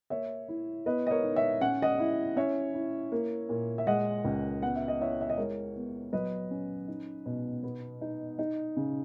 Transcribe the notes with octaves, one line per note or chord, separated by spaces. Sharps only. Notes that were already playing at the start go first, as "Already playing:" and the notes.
A#3 C#5 E5
E4
B3 B4 D#5
D#5
A#4 C#5
D#4
C#5 E5
C#4 F#5
D#5 F#5
E4
C#4 C#5 E5
E4
A#3
A#2
E5
G#3 D#5 F#5
C#2
B3 F#5
E5
D#5
E4 C#5 E5
E5
D#5
G#3 A#4 C#5
B3
F#3 B4 D#5
C#4
D#4
B2
B3
D#4
D#4
C#3